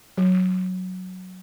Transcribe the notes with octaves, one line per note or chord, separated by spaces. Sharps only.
F#3